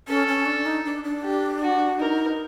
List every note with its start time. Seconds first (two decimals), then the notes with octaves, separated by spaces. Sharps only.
0.08 C#4 A4
0.28 C#4
0.46 D4
0.66 D#4
0.85 D4
1.04 D4
1.23 G4
1.62 F#4
2.00 D#4 A#4